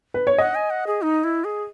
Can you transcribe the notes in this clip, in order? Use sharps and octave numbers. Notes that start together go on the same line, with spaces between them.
B4
C#5
D#5 F#5
G#5
F#5
G#4
D#4
E4
G#4